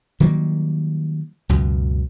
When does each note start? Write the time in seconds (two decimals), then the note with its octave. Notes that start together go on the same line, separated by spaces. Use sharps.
0.20 D#3 F#3 G3 A#3
1.49 C#2 F#2 B2